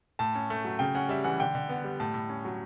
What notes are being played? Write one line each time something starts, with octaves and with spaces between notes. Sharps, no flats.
A2 A5
C#4
A3
F#3
C#3 G5
C#4 F#5
G3 E5
E3 F#5
D3 G5
D3
B3
G3
A2 A5
A2
C#4
F#3